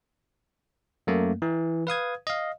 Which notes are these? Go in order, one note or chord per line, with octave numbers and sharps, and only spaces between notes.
F#2 A3 A#3
E3
B4 F5 D#6 G#6
D#5 F5